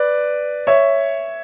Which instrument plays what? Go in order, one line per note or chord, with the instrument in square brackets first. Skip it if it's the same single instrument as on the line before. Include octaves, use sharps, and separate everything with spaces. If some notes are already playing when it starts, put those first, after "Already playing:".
Already playing: [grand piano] B4 D5
C#5 E5